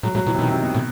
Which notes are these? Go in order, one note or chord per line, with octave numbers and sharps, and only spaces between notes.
A2 F#3
A2 F#3
B2 E3
C3
B2 D#3
C3
B2
A2